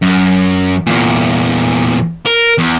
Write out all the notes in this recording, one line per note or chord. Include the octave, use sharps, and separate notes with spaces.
F#2
E2 A#2
A#4
E2